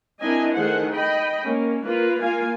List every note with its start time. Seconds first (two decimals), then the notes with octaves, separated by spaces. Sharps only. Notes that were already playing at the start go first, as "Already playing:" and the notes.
0.20 C4 D4 E4 A#4 D#5 G#5
0.53 D#3 A3 G#4 C5 F#5
0.92 D#5 G5 B5
1.43 A#3 C#4
1.82 A#3 F4 B4
2.20 A#3 F4 F5 G#5